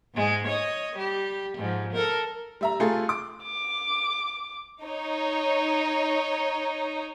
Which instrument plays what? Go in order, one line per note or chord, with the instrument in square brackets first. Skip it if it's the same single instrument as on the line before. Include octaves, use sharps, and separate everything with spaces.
[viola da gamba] G#2 G#3
C#5 D#5
G3 G4
G#2 F3
A4 A#4
[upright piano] G3 E5 A#5
C3 A3 F4 G#4 A4
D6
[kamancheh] D6
[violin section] D#4 C#5